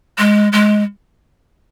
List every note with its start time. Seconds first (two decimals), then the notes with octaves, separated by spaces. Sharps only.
0.18 G#3
0.53 G#3